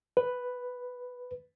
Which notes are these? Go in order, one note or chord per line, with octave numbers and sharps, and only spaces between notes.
B4